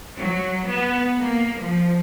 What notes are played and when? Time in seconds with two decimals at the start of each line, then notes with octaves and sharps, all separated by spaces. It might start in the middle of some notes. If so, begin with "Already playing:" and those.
0.17 F#3
0.68 B3
1.22 A#3
1.62 F3